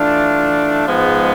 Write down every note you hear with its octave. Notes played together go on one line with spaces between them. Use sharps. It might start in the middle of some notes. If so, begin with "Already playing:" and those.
Already playing: E3 A3 D4 F4
G#2 F3 G#3 B3